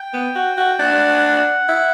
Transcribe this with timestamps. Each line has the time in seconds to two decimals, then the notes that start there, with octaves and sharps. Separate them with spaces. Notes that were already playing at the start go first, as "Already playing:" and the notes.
Already playing: G5
0.14 B3
0.36 F#4
0.57 F#4
0.80 D4 F#5
1.69 E4